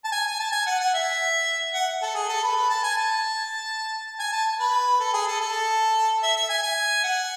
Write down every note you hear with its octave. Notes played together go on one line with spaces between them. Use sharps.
A5
G#5
G#5
A5
G#5
F#5
F#5
E5
F#5
A4
G#4
A4
B4
B4
A5
G#5
A5
G#5
A5
B4
A4
G#4
A4
A4
E5
E5
G#5
G#5
F#5